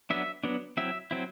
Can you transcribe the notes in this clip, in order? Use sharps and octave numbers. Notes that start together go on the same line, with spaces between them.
F#3 B3 D4 E5
F#3 B3 D4
F#3 C4 E4 E5
F#3 C4 E4